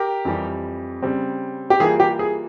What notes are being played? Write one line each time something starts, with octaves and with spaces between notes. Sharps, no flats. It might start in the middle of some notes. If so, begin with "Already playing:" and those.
Already playing: G4 A#4
F2 E3 G3
C#3 G3 C4
G4
E3 G3 A#3 F4 G#4
G4
G#4